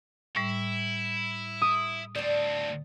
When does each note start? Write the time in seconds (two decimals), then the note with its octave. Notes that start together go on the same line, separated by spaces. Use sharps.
0.36 A2 G3 E4
1.62 D#6
2.15 D2 C4 D5 A5